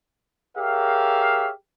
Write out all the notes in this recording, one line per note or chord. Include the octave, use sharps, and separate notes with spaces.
G4 G#4 A#4 C#5 E5 F5